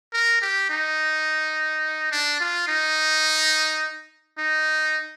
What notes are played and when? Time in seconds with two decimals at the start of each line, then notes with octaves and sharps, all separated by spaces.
0.13 A#4
0.42 G4
0.70 D#4
2.12 D4
2.40 F4
2.68 D#4
4.38 D#4